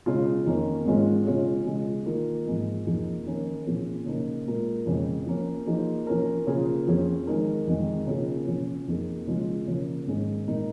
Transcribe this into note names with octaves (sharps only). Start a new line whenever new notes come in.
C#3 G#3 F4 G#4
F2 D#3 A#3 C#4 A#4
G#2 G#3 C#4 F4 G#4
C#3 G#3 C#4 F4 G#4
C#3 G#3 F4
D#3 A#3 F4 A#4
G#2 F3 G#3
F2 F3 A#3 D#4 G#4
D#3 C#4 A#4
A#2 F3 C#4 G#4
C#3 A#3 D#4 A#4
A#2 G#3 F4 A#4
F2 C#3 G#3
F3 A#3 C#4
F3 A#3 D#4 G#4
F3 C#4 A#4
C#3 A#3 F4 G#4
F2 F3 C#4 G#4
D#3 G#3 D#4 A#4
F2 D#3 G#3
C#3 A#3 C#4 F4 G#4
C#3 F3 C#4
F2 F3 A#3 D#4 G#4
C#3 F3 G#3 F4
C#3 F3 A#3
G#2 D#3 C#4 G#4
A#2 G#3 D#4 A#4